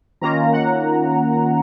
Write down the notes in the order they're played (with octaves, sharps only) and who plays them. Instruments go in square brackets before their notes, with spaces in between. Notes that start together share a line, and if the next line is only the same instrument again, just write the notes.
[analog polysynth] D#3 A#3 C#4 F4 A#5
F#5